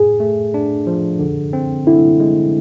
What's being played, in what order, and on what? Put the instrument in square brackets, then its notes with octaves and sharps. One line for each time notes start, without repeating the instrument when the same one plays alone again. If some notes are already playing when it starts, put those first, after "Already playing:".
Already playing: [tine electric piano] A2 [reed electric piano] G#4
[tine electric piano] A3
D4
F3
D3
C4
[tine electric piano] D3 [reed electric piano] E4
[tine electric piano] G#3